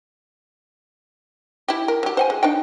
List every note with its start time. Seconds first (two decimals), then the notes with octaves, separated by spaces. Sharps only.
1.68 E4 G4
1.88 A#4
2.03 F#3 G4
2.17 C5 F#5 G#5
2.30 G#3
2.43 D4 D#4 G5